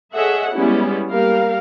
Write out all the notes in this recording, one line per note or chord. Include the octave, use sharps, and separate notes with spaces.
G#4 A4 C#5 D#5 E5 F#5
G3 G#3 B3 C#4 E4
G3 A#3 A#4 F5